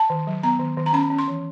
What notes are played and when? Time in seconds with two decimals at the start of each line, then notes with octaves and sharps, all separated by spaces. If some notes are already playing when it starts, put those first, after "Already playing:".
Already playing: A5
0.10 D#3
0.27 F#3
0.43 B3 A#5
0.60 D#3
0.77 D#3
0.86 A#5
0.93 C#4 B5
1.10 C#4
1.18 C6
1.28 E3